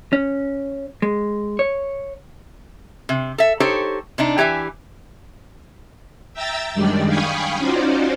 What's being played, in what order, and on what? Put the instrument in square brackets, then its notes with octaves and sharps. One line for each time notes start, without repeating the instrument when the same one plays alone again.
[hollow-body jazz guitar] C#4
G#3
C#5
[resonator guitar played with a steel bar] C3
A4 E5
D#4 G4 A4 C5 C#5
C3 D4 D#4
E3 G4 E5 G#5
[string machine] E5 G5 A#5 E6 A6
F#2 D#3 G3 G#3 D4 D5
F5 G5 G#5 B5 C#6 D#6
C#4 D#4 F4 F#4 C5 D5